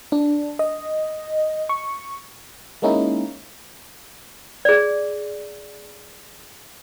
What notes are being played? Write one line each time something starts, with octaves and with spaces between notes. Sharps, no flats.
D4
D#5
C#6
G#3 A#3 C#4 D#4 E4
G#4 D5